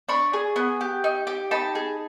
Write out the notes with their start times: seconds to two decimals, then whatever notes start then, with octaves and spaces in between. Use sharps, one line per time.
0.09 D4 B5 C#6
0.33 G#4
0.56 B3
0.81 G4
1.04 D#4
1.27 G4
1.51 D#4 A5 B5
1.75 G#4